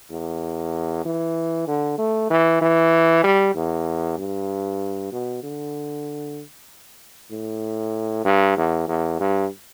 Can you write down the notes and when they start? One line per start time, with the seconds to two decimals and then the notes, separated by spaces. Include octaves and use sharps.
0.11 E2
1.05 E3
1.67 D3
1.98 A3
2.30 E3
2.62 E3
3.24 G3
3.55 E2
4.18 G2
5.12 B2
5.43 D3
7.31 A2
8.25 G2
8.57 E2
8.88 E2
9.20 G2